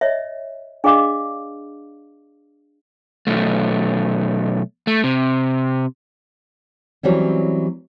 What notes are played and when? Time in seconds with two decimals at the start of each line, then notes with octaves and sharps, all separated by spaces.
0.01 C#5 D#5 E5
0.84 D4 G#4 D5 D#5 F5 D6
3.27 B1 A3
4.87 A3
5.04 C3
7.03 E3 F#3 G3 C4 C#4